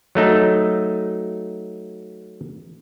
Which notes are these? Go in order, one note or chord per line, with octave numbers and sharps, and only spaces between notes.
F#3 A3 D#4